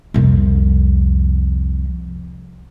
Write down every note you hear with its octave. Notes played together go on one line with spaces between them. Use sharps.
C2 F2